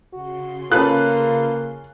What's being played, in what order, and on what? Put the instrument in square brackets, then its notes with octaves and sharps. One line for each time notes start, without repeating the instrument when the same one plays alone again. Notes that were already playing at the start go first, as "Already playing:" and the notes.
[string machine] C#3 C6 [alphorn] F#4
[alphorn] A#3 [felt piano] C#4 F#6 [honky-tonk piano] F4 A4 B4